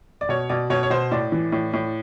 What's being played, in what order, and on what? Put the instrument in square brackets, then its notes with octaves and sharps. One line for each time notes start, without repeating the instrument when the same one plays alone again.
[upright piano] D5
B2 C#5
B2 D5
B2 C#5
C#5
B2 C5
A2 D5
E3
A2
A2